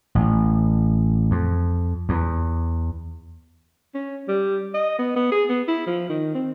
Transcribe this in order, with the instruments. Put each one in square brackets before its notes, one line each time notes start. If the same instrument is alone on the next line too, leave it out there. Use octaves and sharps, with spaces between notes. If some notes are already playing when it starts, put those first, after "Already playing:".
[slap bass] A1
F2
E2
[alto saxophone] C#4
G3
D#5
B3
B3
G#4
B3
E4
F3
D#3
C4